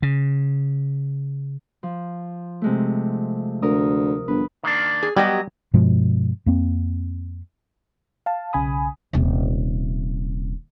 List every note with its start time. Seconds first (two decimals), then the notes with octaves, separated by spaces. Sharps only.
0.02 C#3
1.83 F3
2.62 C3 G#3 A3
3.62 D2 A#4 D#6
4.28 G1 B4
4.64 D#3 A#3 D4
5.03 G#4
5.16 F#3 G3 B3 G4 D#5
5.74 G2 B2 F3 G#3
6.46 F2 A#3 C4
8.26 F5 A5
8.53 B1 C#3 G#5 B5 D#6
9.13 D#1 C3